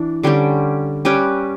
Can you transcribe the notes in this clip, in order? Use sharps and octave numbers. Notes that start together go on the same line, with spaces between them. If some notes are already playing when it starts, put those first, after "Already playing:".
Already playing: E3 D4
D3 G3 C#4 G4
G3 C#4 G4 B4